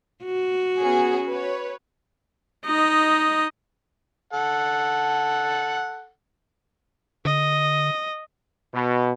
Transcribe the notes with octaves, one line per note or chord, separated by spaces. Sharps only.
F#4
B3 C#4 G#4
B4 C#5
D#4 D#5
A4 F#5
D3 D#5
B2